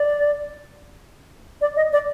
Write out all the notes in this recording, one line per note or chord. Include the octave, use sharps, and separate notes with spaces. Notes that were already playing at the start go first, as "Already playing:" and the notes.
Already playing: D5
D5
D#5
D5